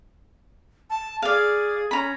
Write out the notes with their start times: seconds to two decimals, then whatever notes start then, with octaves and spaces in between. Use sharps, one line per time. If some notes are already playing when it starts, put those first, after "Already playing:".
0.90 A5
1.22 G#4 D5 F5
1.91 C#4 A#5 B5